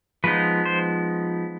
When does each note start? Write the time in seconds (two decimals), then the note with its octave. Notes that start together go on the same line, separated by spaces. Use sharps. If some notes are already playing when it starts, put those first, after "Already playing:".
0.24 F3 G#3 B3 D#4 B4
0.66 C5